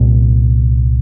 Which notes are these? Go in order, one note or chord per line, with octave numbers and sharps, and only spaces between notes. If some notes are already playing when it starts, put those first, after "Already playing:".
Already playing: C2 A#2